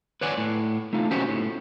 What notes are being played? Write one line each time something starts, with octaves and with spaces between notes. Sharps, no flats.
B4 C#5 D5 F#5 G#5
A2
A3 D#4 F4
C#4 F#4 G4 B4 C5
A2